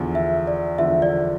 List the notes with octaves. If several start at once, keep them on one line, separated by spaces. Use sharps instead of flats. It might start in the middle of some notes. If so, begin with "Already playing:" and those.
Already playing: E2 D3 F3
E5
D5
E2 D3 F3 E5
D5